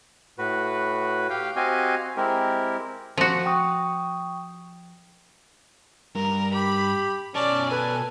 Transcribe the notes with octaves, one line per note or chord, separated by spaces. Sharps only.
A2 F#4 B4
G4 F5 G5
C4 F#4 G4 D#5 F5 G#5
G#3 C4 E4 G4 A#4
F3 F#4
G5 C#6 D#6
G2 A#4
G4 B5
B2 C#4 A#4 D5 A5
A4 B4 G#5